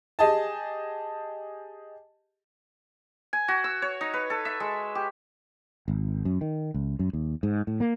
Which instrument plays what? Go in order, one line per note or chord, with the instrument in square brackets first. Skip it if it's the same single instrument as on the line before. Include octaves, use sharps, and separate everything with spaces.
[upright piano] G4 G#4 D#5 G#5 A5
[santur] G#5
F#4
E6
C#5
D#4
B4
A4
E5
G#3
G4
[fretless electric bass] G#1
F#2
D#3
C#2
F#2
D#2
G#2
A2
A#3